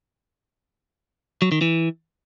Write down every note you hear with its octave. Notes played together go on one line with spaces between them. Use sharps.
F#3
D#3
E3